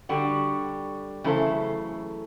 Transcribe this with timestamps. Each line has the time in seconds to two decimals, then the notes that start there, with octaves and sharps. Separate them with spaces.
0.09 D3 G3 F#4
1.24 C#3 E3 F#3 A3 A4 C5